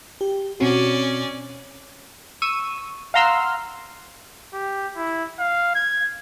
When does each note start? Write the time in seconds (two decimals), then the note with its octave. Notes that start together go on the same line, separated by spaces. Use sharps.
0.21 G4
0.60 B2 C4 C#4 F#4 D5
2.42 C#6 E6 D#7
3.14 F5 F#5 A#5 C6 E6 F6
4.53 G4
4.96 E4
5.39 F5
5.75 G#6